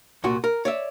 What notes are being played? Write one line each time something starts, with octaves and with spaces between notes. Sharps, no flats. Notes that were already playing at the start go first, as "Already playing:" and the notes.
C2 A#2 F#4
A#4
C#5 D5 E5